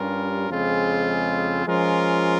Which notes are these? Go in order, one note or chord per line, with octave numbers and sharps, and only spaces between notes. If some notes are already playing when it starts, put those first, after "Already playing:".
Already playing: G2 G3 C#4 F4 A#4
F2 C#3 G#3 C4 F4
F3 G#3 C#4 F4 A#4